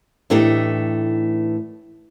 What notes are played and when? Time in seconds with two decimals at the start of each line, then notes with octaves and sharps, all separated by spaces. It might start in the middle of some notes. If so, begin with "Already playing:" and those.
0.30 A2 E3 A3 D4 D#4 G4